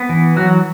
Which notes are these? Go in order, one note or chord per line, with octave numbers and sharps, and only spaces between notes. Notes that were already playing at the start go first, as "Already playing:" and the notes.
Already playing: B3
E3
F#3 F#4